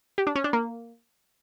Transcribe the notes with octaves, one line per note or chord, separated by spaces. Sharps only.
G4
D4
C#4
D4
A#3